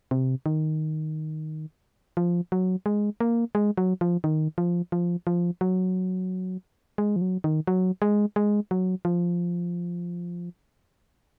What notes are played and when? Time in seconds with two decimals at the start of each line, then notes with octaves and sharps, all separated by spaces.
0.11 C3
0.46 D#3
2.17 F3
2.52 F#3
2.86 G#3
3.20 A#3
3.55 G#3
3.78 F#3
4.01 F3
4.24 D#3
4.58 F3
4.92 F3
5.27 F3
5.61 F#3
6.98 G#3
7.16 F3
7.21 F#3
7.44 D#3
7.67 F#3
8.02 G#3
8.36 G#3
8.71 F#3
9.05 F3